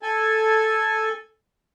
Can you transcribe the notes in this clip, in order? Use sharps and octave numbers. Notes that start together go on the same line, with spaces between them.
A4 G#5